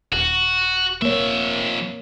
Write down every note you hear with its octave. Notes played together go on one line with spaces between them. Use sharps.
D#1 F#4
F2 A#3 C#5 E5